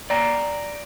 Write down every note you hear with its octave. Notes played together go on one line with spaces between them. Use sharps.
D5 G5 A#5